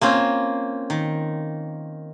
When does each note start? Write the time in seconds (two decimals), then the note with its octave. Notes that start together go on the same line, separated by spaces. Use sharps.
0.01 A#3 C4 C#4 F4
0.90 D#3